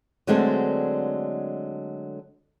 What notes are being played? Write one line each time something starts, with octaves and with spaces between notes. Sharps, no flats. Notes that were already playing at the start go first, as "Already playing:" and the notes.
D3 F#3 G#3 A3 C4 D4